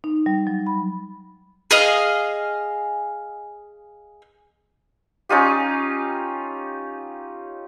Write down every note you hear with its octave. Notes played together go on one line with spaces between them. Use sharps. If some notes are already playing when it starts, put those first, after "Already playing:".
D#4
G3
F#3
B5
G#4 D#5 F5
C#4 D#4 F4 G4